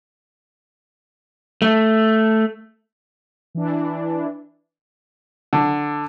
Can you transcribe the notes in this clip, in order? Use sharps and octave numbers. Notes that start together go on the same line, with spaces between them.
A3
E3 D4
D3